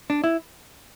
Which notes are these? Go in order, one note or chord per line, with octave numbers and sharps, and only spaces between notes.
D4
E4